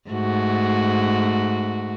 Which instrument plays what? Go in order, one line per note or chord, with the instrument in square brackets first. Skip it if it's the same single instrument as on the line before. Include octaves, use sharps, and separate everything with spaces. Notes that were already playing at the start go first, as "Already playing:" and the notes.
[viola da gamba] G#2 A3 F#4